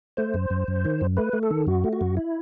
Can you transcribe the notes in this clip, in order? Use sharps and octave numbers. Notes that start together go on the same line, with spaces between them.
A3 C5
F#2
F#2
F#2
D#3
F#2
A3 B4
A3
A4
D#3
F#2 F#4
A3
F#4
F#2
E4